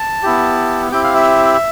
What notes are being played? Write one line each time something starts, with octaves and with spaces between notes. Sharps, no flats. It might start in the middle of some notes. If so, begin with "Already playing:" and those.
Already playing: A5
B3 E4 G4
C4 E4 G4 G5
F5
E5